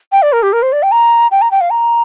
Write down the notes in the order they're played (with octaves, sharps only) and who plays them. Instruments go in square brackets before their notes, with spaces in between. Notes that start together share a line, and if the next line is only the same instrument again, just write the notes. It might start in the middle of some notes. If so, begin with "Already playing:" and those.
[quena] G5
D5
A#4
G4
A#4
C5
D5
G5
A#5
G5
A#5
G5
F5
A#5